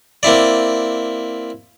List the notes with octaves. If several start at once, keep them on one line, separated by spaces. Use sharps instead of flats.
A#3 C4 E4 D5